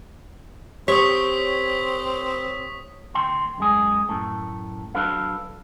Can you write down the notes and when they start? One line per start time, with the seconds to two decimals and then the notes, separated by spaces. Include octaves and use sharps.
0.88 C4 G4 C#5 D#6 B6
3.14 D2 G5 C6
3.58 F#2 G#3 G#4
4.09 F#2 A2 A3
4.95 F#3 D4 A4 B4 F5